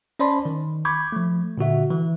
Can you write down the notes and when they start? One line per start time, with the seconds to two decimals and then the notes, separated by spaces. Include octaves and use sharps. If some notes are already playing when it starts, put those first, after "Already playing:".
0.19 C#4 C5 D5 A5 B5 C6
0.45 D#3
0.85 B5 C#6 D6 G6 G#6
1.12 F3 A3
1.58 A#2 D3 F#4 E5
1.90 E3